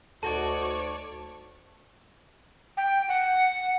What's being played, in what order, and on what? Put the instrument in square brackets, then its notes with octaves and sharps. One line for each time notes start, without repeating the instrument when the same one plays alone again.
[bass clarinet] D2 [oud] D#4 F#4 A4 [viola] C#5 D5 [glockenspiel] A5
[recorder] G5
F#5